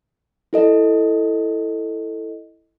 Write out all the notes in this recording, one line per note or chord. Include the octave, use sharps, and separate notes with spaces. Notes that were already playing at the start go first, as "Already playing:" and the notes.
E4 A4 D#5